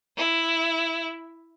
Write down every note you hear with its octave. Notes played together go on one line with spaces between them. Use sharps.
E4